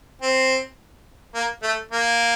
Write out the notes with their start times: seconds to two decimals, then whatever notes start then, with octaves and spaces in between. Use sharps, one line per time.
0.22 C4
1.35 A#3
1.63 A3
1.91 A#3